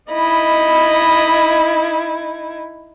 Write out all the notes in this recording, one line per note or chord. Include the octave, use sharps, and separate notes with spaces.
D#4 E4 D#5 B5